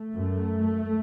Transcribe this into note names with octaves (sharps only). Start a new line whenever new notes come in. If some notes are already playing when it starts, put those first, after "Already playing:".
Already playing: A3
F#2